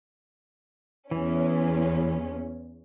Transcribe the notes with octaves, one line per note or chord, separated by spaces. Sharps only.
E2 E3 C#4